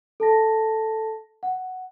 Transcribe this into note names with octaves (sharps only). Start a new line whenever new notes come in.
A4 A5 A#6
F#5